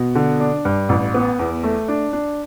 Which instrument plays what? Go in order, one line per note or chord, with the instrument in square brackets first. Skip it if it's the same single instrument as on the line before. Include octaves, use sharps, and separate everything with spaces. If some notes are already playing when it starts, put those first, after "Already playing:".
Already playing: [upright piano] B2
D3
D4
G2
A1
B3
E2
A3
D4
D4